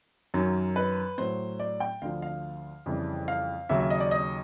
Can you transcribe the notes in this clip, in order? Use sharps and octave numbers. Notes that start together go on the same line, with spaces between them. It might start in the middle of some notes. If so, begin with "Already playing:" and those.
F#2 D#3 F#3
B4
A2 F#3 C5
D5
G5
D2 D3 F3 F5
F5
F2 C#3 E3 G3
F5
D#2 C#3 F#3 E5
E5
D#5
D5
D#5